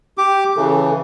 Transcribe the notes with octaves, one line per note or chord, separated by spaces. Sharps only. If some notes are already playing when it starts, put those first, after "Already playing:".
G4 D6
C#3 E3 A4